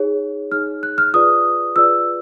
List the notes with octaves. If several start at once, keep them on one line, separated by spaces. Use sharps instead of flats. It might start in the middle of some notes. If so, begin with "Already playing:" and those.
Already playing: D#4 G#4 C#5
D#4 G#4 C#5 F6
F#6
F6
F4 G#4 B4 D5 D#6
F4 G#4 B4 D5 E6